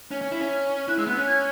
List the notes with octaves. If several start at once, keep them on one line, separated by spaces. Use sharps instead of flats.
C#4
C#4
E4
C#4
E4 F#6
G#3 E6
B3 F#6
C#4 F#6
G#6